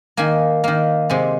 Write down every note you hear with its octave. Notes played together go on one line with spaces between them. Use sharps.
D#3 A#3 G#5
D#3 A#3
C3 G#3